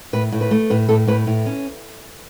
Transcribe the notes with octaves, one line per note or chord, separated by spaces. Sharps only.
A2 B4
A2
B4
A3
A2 B4
A2 A4
A2 B4
A2
C#4